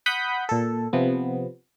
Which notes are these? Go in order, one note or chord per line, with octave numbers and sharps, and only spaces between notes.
F#5 B5 D#6 G6 B6
A#2 A4
C3 F3 B3